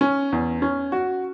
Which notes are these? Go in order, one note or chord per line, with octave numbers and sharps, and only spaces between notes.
C#4
E2
C#4
F#4